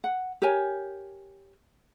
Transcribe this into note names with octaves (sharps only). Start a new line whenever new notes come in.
F#5
G4 A#4 C#5 G#5